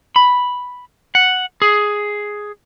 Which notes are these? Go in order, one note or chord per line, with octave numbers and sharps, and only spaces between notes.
B5
F#5
G#4